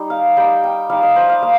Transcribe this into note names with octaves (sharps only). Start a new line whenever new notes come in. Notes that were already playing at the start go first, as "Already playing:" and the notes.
Already playing: G3 D#4
F5
G3 D#4 G5
G5
G3 D#4 F5
D#5
C5
F5
A#3 F5